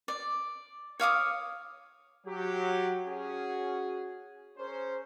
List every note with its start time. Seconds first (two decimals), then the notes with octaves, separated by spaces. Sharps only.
0.08 D5
1.00 C#5 F5 D6 D#6
2.26 F#3 G4
3.06 C#4 F#4 G#4
4.57 C#4 G#4 A#4 C5